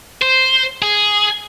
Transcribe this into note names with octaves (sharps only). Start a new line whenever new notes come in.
C5
G#4